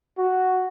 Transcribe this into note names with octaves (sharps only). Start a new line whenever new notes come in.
F#4